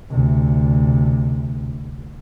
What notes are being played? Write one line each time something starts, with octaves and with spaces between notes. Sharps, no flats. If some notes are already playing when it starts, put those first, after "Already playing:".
D2 C3